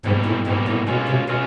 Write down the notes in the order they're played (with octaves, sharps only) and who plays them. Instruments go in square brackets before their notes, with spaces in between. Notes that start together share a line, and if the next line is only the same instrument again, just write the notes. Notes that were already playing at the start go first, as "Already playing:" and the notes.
[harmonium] G#2 [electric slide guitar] B2 G3 A#3
[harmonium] A2
[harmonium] G#2 [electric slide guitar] B2 G3 A#3
[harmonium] A2
[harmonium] B2 [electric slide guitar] G#3 C#4 F4
[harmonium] C3
[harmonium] B2 [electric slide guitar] G#3 C#4 F4